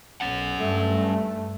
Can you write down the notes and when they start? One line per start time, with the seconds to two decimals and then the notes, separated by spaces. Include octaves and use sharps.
0.21 B1 C#4 F#5
0.59 G2 A3